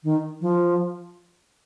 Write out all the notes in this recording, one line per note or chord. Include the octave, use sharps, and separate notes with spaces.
D#3
F3